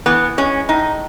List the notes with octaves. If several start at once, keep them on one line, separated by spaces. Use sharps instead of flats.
E3 B3
G#3 C#4
A2 D#4